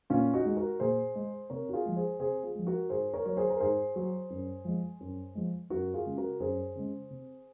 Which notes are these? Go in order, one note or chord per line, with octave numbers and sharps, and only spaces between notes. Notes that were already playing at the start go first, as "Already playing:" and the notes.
A#2 C#4 F4
D#4 F#4
G#3
F#4 A#4
A#2 G#4 C5
G#3
C3 A#4 C#5
F#4
F4 G#4
F3 G#3
G#4 C5
C3 G#4 C5
F4 G#4
F3 G#3
F#4 A#4
G#2 G#4 C5
A#4 C#5
F#3 C#5
G#4 C5
A#4
G#2 G#4 C5
F#3
F#2
F3 G#3
F#2
F3 G#3
F#2 F#4 A#4
F4 G#4
C#3 G#3
F#4 A#4
F#2 G#4 C5
C#3 G#3
C3